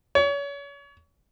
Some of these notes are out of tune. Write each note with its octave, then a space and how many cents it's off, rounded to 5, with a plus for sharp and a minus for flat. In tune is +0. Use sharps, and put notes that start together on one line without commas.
C#5 +35